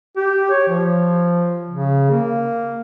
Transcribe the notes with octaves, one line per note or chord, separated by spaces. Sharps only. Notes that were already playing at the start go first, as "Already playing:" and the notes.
G4
C#5
F3
C#3
A#3